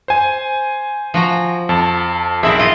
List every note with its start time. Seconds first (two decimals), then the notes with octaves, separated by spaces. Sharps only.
0.08 C5 G#5
1.14 F3 F#4 A#5
1.69 F2 A5
2.43 B1 C4 E4 G#4 A#4 E5
2.59 F4 D#5